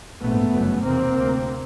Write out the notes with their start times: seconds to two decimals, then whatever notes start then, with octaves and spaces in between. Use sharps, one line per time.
0.20 A#1 G#2 A3 B3
0.51 G1 F#2 C#3
0.82 F1 E2 B2 A#3 C4
1.13 D2 C3